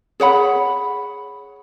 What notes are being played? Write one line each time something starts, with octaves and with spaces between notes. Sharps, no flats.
G#4 C#5 F#5 B5